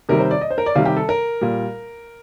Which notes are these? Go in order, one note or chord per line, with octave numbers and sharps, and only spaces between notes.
C3 D#3 G3 A#4
C5
D5
D#5
C5
A#4
D5
C3 D#3 G3 F5
G4
A4
A#4
A#2 G3